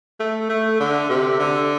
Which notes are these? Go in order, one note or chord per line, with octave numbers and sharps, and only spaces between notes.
A3
A3
D3
C3
D3